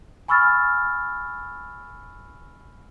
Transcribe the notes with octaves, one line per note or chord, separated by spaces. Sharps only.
G#5 B5 C#6 E6 F6 A6